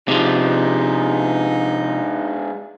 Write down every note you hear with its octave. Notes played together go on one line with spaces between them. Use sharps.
C3 F3 G#3 D4 D#4